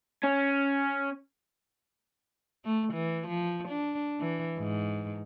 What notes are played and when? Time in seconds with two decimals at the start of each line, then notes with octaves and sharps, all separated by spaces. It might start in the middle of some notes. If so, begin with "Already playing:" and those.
0.24 C#4
2.65 A3
2.93 E3
3.27 F3
3.68 D4
4.20 E3
4.58 G#2